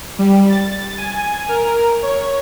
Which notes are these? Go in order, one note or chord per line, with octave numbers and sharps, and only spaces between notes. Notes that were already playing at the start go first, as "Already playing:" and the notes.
G3
A6
G#5
A#4
C#5